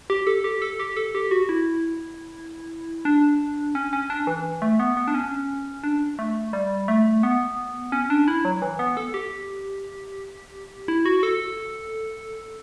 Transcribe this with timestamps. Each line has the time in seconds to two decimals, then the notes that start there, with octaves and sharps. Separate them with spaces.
0.10 G4
0.27 A4
0.44 G4
0.62 A4
0.80 G4
0.96 A4
1.15 G4
1.31 F#4
1.49 E4
3.05 D4
3.75 C#4
3.93 C#4
4.10 D4
4.27 E3
4.62 A3
4.80 B3
4.97 B3
5.08 D4
5.14 C#4
5.84 D4
6.19 A3
6.53 G3
6.88 A3
7.23 B3
7.92 C#4
8.10 D4
8.28 E4
8.45 F#3
8.62 E3
8.79 B3
8.97 A4
9.14 G4
10.88 E4
11.05 F#4
11.23 A4